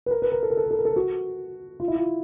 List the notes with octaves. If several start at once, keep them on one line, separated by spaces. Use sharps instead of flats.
B4
A#4
B4
A#4
A4
A#4
A4
A#4
A4
A#4
A4
F#4
F4
E4
F4